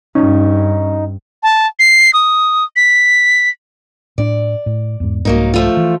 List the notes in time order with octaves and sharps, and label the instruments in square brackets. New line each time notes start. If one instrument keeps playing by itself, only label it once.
[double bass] G2 [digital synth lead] C#4 [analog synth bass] D#4
[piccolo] A5
C7
D#6
B6
[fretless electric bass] A2 D4 [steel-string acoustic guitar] D5
[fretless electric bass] A2
E2 G#2
[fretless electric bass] C2 G#2 [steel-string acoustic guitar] F#3 A#3 D#4
[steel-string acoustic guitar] F3 A3 F4
[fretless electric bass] E3